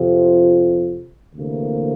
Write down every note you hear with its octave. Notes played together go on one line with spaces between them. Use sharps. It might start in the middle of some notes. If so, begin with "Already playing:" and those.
Already playing: F2 C3 F3
D2 C3 E3 A#3